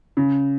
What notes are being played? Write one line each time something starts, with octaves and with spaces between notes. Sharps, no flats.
C#3